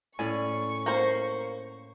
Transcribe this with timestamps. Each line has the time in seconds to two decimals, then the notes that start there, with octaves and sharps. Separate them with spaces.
0.19 A2 C#4 D5 G#5 C#6
0.86 A#3 C5